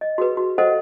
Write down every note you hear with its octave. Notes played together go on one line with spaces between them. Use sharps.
D#5
F#4 G#4 B4
F#4
A4 C5 D#5 F5 F#5